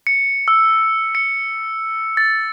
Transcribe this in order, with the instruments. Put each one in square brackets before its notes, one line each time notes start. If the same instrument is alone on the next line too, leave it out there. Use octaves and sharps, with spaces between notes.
[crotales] C#7
E6
C#7
A6